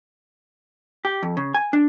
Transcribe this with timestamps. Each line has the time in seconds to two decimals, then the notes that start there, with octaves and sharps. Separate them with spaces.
1.05 G4
1.23 F2
1.37 C#3
1.54 G#5
1.73 D4